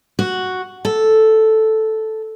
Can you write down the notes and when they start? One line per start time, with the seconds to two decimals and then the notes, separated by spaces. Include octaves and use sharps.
0.19 F#4
0.85 A4